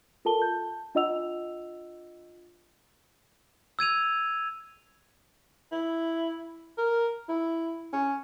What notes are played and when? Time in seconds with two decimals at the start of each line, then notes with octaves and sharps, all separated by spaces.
0.25 F4 A4 A#4 A5 G7
0.40 A5 G6
0.95 D4 F4 D#5 F#5 E6 F7
3.79 E6 G#6 D#7 F7
5.72 E4
6.78 A#4
7.29 E4
7.93 C#4